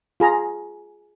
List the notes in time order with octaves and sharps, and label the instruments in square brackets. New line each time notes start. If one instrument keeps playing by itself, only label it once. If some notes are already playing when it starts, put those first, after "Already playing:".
[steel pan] F4 G#4 A#5